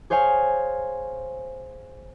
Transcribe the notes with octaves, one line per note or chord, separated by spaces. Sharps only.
G#4 C5 C#5 F5 G#5